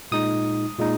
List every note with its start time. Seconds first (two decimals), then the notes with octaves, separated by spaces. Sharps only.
0.12 A#2 G#3 D#4 D#6
0.79 A#2 G#3 D#4